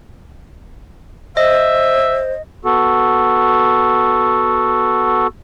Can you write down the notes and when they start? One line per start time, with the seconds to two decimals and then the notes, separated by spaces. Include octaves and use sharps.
1.37 C5 D#5 E5
2.65 B3 F#4 A4